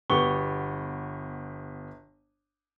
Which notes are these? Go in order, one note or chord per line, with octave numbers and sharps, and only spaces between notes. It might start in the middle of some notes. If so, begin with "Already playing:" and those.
G1 B2 B3 G4 C#6 G7